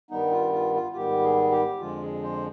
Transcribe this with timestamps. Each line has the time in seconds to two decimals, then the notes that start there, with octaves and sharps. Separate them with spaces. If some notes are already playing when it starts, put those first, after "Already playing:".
0.11 G2 D#3 G3 B3 D#4
0.31 F4
0.52 F4
0.75 F4
0.92 F4
0.95 G#2 D#3 G3 B3 G4
1.23 G#4
1.51 G4
1.80 F2 D3 F3 G#3 F4
2.02 G#4
2.23 C5